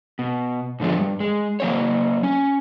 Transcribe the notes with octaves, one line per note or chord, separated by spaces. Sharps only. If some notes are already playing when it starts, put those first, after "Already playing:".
B2
G#2 D3 F3 G#3 B3
G2
G#3
F#3 A#3 B3 C5 C#5
C#4